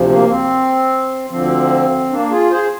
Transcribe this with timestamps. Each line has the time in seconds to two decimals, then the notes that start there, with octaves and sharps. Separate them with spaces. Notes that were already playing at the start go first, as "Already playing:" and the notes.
Already playing: D2 C3 F3
0.10 A#3
0.29 C4
1.30 D2 D3 F3 C4
2.11 A#3 D4
2.31 F4 G#4
2.51 G#4 C5